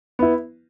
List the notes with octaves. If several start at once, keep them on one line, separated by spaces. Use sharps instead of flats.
B3 E4